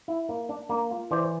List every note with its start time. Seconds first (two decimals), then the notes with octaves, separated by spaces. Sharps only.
0.08 E4
0.29 A#3
0.49 D4
0.69 A#3
0.91 F4
1.11 E3 C5 D5